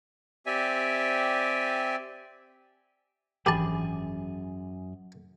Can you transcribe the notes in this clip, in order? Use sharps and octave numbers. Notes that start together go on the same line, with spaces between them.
C4 G4 D5 E5 G#5
G#1 F#2 E3 D4 G4 G#4 A5 B5